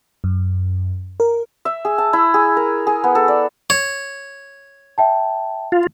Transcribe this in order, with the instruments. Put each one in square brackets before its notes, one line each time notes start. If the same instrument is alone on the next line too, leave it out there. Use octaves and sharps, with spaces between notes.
[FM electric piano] F#2
A#4
[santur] E5
G#4
A5
E4
G#4
A#4
G#4
B3
A4
D5
[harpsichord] C#5
[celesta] E5 G5 A5
[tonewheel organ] F4